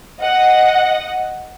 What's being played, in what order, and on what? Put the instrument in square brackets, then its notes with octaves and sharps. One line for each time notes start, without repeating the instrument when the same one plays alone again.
[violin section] D#5 F#5